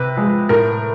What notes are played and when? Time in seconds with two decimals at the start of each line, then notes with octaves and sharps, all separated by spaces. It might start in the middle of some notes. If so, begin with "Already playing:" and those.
Already playing: C3 B4
0.16 F3 G#3
0.49 A2 A#4